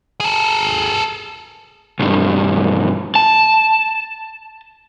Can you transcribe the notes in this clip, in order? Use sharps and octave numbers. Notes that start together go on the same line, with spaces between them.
G#4 A4
B1 G2
A5